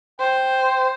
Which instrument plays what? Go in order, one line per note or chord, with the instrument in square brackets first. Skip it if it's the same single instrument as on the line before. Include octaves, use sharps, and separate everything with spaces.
[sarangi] C5 [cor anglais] G5